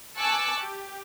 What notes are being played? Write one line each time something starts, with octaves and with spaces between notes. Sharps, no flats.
G#5 A5 C#6 D6 E6 F#6
G4